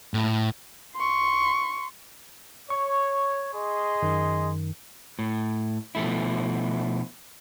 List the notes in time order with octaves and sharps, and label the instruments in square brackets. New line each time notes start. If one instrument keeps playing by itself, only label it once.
[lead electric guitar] A2
[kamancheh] C6 C#6
[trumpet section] C#5 [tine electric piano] C#6
[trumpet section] G#4 D#5 C6
[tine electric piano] F#2 D#3
[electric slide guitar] A2
B2 F3 A3 E4